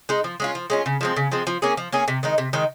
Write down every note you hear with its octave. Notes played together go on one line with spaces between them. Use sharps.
G#3 D#4
F3
G#3 C#4 F4
F3
G#3 C#4 F4
C#3
F3 G#3 C4
C#3
F3 G#3 C4
F3
A#3 C#4 G#4
F3
A#3 C#4 G#4
C3
D#3 G#3 D#4
C3
D#3 G#3 D#4